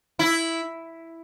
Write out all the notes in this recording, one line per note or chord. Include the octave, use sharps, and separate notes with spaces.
E4